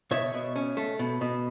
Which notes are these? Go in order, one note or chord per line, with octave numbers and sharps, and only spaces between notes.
B2 C#5 E5
B2
C#4
A3
B2
B2